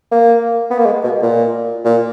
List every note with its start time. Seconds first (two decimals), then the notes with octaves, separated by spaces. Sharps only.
0.12 A#3
0.71 B3
0.79 A#3
0.86 G#3
1.04 B2
1.23 A#2
1.85 A#2